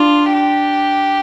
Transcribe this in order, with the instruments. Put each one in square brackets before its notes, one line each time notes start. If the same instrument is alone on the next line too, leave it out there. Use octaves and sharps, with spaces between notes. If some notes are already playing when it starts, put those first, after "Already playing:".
Already playing: [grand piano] D4 [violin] F4
[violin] G4